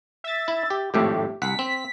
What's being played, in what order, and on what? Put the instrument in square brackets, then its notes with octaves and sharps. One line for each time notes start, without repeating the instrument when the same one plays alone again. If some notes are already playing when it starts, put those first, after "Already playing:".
[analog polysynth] E5 A6
[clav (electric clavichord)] E4
G4
[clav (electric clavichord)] G#1 F2 A2 [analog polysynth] A3 G4
[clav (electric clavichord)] C2 F#5 [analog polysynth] B6
[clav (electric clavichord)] C4